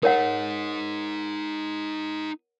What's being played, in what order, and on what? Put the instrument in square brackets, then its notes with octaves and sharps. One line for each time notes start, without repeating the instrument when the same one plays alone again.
[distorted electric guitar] D#4 G#4 [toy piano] A#4 C#5 F#5